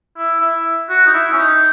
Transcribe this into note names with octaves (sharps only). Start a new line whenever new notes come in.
E4
E4
F#4
D#4
E4
C#4
D#4